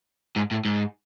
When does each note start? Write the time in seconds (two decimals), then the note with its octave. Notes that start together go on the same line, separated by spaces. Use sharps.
0.36 G#2
0.51 A2
0.65 G#2